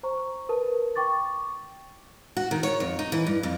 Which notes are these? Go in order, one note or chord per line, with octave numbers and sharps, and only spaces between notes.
C5 A#5 C#6
A#4 B4 A5
G5 C#6 D6 A6
F#4
D#3
C#5
F2
D#4
E3
G2
F2